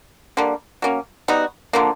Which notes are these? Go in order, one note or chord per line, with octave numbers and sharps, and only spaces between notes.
D3 G3 A#3
F#3 A#3 C#4
G3 B3 D#4 F#4
D3 F3 A#3